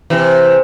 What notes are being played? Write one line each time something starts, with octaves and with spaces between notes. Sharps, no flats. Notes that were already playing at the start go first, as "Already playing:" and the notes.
C3 E3